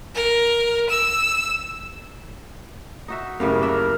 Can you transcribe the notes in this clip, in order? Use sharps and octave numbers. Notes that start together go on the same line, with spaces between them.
A#4
E6
D#4 F#4 E5
F#2 A2 C#3 G3 A#4 F5
A#3 D4 A#4 E5